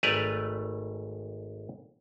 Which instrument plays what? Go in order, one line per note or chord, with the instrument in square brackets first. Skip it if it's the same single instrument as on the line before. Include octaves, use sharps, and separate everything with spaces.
[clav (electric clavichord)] G#1 A3 B4 D5 G#5 A#5